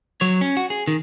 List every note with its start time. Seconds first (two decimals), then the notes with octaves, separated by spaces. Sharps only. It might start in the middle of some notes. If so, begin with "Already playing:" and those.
0.21 F#3 C#5
0.41 C#4
0.57 F#4
0.70 G#4
0.88 D#3